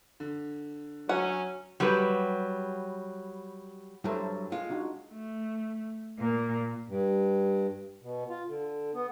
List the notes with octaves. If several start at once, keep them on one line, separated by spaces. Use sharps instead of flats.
D3
F#3 C#4 F#5
F#3 G3 G4 B4
G2 F#3 E4 A4 C5
G#3 F4
D4 D#4 F#4
A3
A#2 A#3
G2
B2
F4
D3
B3